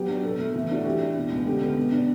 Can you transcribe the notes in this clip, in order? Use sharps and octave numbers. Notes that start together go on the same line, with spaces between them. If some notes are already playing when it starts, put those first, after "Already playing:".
Already playing: F#3 B3 G4
D4
B2 A4
A3
E3
D4 F#4
E3 G4
D4
B2
C#2
D3 G4
B3
B2
D4